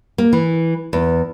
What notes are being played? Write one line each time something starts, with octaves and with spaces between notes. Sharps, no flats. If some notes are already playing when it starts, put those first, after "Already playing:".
A#3
E3
E2